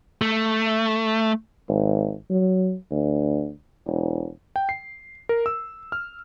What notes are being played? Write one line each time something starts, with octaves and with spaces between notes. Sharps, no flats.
A3
G#1
F#3
D2
E1
G5
C7
A#4
E6
F6